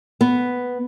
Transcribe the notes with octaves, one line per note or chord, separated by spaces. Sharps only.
B3